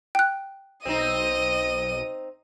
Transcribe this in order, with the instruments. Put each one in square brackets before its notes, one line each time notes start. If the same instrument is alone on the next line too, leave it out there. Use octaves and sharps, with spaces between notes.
[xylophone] G5 F#6
[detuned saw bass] B1 [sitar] C4 D#4 [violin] D#5 D#7